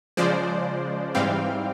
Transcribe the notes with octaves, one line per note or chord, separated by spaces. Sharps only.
C#3 F3 G#3 C5 D5
G#2 E3 G3 C4 F5 G5